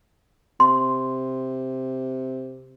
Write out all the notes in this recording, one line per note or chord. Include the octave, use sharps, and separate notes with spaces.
C3 C6